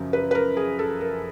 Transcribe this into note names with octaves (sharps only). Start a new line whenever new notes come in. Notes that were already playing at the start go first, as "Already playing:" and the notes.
Already playing: F#2 C#3 F3
B4
B4
A#4
G#4
A4
A#4